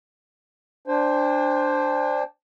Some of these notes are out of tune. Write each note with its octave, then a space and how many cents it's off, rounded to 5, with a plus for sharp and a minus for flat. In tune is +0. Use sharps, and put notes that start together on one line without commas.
D4 +0 C5 +0 G5 +45